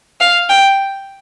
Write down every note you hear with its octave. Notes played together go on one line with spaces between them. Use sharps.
F5
G5